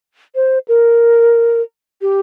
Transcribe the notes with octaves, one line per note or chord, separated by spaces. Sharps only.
C5
A#4
G4